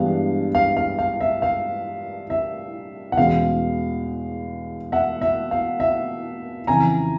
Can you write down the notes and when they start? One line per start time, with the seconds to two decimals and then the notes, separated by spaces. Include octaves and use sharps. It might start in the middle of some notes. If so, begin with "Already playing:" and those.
Already playing: G2 E3 G#3 B3 D4 F5
0.55 F5
0.77 F5
0.99 F5
1.21 E5
1.42 F5
2.30 E5
3.12 F#5
3.17 E2 B2 G#3 C#4 F5
4.92 E5 F#5
5.22 E5
5.51 F5
5.80 E5
6.67 F2 C#3 E3 G#5 A#5